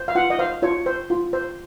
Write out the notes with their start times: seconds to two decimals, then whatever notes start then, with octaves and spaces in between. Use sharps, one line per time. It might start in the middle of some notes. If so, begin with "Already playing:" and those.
Already playing: C5
0.08 F5
0.15 F4 F#5
0.30 D#5
0.39 C5 F5
0.62 F4 C#5
0.86 C5
1.10 F4
1.33 C5